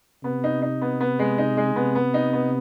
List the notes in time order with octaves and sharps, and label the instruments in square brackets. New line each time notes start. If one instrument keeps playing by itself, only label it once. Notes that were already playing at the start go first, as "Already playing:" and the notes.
[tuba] C3 [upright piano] B3
[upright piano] D#4
D#4
B3
B3
G#3
D#4
G#3
[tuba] C3 [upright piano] B3
[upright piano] B3
D#4
B3